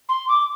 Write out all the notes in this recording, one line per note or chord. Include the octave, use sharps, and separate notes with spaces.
C6
D6